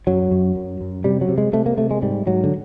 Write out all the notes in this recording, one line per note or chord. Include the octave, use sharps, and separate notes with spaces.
F#2 F#3
F#2
F#2
F#2
C3 G3
F#3
C3
G#3
C3 A3
A#3
C3 A3
G#3
G#2 G3
G#2 F#3
D3